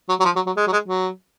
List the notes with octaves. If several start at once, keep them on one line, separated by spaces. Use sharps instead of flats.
F#3
F#3
F3
F#3
F#3
G#3
F#3
G#3
F#3